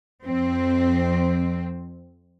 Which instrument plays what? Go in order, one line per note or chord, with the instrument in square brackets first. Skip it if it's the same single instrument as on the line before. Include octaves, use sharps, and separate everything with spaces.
[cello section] F2 C4